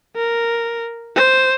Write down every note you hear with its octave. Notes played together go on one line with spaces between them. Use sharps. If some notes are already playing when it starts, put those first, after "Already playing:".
A#4
C5